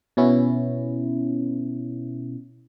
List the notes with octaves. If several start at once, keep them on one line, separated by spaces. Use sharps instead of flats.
B2 B3 C#4 E4